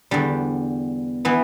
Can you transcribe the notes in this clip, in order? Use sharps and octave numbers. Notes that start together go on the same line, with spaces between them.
E2 D3 G3
E3 B3